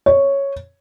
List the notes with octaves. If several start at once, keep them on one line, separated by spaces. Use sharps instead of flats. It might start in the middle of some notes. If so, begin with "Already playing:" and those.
C#5